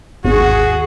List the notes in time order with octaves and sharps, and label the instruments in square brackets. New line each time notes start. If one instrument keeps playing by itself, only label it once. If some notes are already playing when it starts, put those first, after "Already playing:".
[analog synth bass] G#1 [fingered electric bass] D#2 [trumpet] F#4 [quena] G#4